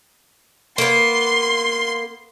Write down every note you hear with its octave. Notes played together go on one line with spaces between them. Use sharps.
A#3 B3 C6